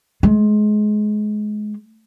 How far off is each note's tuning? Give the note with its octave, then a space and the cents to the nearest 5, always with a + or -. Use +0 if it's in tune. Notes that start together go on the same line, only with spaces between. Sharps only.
G#3 +25